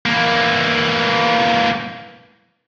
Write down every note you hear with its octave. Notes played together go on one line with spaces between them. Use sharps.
E3 A#3